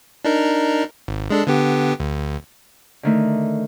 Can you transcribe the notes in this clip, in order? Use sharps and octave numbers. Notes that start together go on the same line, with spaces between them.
D4 D#4 A#4
G#1
G#3 D4 A4
D3 B3 G4
D2
D3 D#3 A3